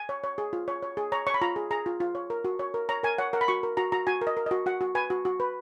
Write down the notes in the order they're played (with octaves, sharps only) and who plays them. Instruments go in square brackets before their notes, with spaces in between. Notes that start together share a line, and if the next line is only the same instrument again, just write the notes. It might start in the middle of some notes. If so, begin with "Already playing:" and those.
Already playing: [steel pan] G#5
C#5
C#5
G#4
F4
C#5
C#5
G#4
C#5 A#5
C#5 C#6
B5
F4 A#5
G#4
G#4 A#5
F4
F4
C#5
A#4
F#4
C#5
A#4
C#5 A#5
A#4 G#5
C#5 F#5
A#4 F#5
B5
F#4 C#6
A#4
F#4 A#5
F#4 A#5
F#4 G#5
A#4
D#5
A#4
F#4 D#5
F#4 F#5
F#4
B4 G#5
F#4
F#4
B4